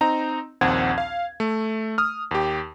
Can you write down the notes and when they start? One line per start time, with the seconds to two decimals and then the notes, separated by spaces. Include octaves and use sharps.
0.01 C4 D#4 A#5
0.61 A#1 D#2 C4 F#5 G#6
0.98 F5
1.40 A3
1.98 D#6 F6
2.31 D#2 G4